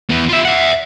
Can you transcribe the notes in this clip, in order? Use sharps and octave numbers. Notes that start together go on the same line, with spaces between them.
E3 B3
F4 E5
E5 F#5